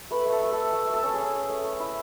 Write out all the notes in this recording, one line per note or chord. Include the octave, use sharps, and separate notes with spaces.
A3 B4
A3
A4
A3
A3 A4
A3
A3
A4
C#4
C#4 G#4
A3
A3
A3
E4